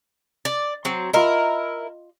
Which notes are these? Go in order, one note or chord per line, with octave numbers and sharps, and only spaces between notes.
D5
F#3 C4
E4 F4 A#4 D#5